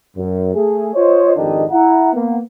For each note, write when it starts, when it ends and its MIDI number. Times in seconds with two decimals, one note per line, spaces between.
0.17 0.53 42
0.55 0.89 57
0.55 0.89 68
0.94 1.32 65
0.94 1.32 72
0.94 1.32 73
0.94 1.32 75
1.36 1.64 32
1.36 1.64 41
1.36 1.64 51
1.36 1.64 62
1.36 1.64 67
1.36 1.64 75
1.71 2.11 64
1.71 2.11 78
1.71 2.11 82
2.13 2.38 58
2.13 2.38 59